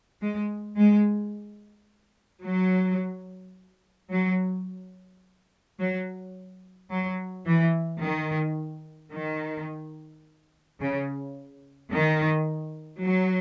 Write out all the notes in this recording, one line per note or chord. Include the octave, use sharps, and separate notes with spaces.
G#3
G#3
F#3
F#3
F#3
F#3
E3
D#3
D#3
C#3
D#3
F#3